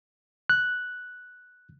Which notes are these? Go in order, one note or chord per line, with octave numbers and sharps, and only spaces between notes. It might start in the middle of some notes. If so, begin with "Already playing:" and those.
F#6